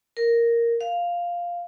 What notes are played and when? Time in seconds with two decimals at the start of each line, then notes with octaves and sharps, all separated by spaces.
0.17 A#4
0.81 F5